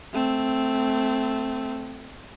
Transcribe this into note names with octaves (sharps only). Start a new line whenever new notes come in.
A3 C4